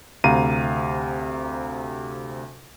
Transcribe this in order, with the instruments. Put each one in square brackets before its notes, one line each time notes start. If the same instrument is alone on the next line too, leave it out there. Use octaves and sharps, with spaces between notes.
[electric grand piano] D2 C3 F5 A#5 D#7